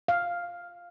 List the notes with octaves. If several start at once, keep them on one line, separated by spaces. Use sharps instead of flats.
F5